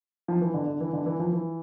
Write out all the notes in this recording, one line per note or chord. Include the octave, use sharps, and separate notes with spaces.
F3
E3
D3
D3
E3
D3
E3
F3
E3